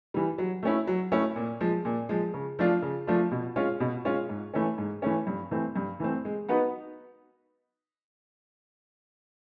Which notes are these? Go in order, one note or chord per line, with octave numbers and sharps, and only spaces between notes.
E3 G3
F#3
A3 C#4 E4
F#3
A3 C#4 E4
A#2
F3 G#3
A#2
F3 G#3
C#3
F3 A3 D4 F4
C#3
F3 A3 D4 F4
B2
G#3 C#4 F4
B2
G#3 C#4 F4
G#2
E3 A3 C#4
G#2
E3 A3 C#4
G2
E3 A3 C4
G2
E3 A3 C4
G#3
B3 D#4 F#4 B4